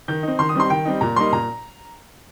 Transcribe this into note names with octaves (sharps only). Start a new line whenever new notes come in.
D#3 G6
C4 D#4
D#3 C6
D#6
G3 C4 D#4 C6
D#3 G5
G3 C4 D#4
A#2 A#5
G3 A#3 D#4 C6
A#2 A#5